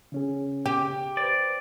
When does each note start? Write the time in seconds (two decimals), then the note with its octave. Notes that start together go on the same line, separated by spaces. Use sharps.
0.12 C#3 C#4 G#4
0.66 G4 G5
1.17 B4 C5 D5